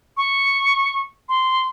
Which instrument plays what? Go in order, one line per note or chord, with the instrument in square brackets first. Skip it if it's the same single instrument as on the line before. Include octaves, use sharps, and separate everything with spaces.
[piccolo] C#6
C6